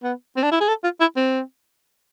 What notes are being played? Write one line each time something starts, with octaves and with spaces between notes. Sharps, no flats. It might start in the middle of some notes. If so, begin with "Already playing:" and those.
B3
C4
D4
E4
G#4
A4
F4
E4
C4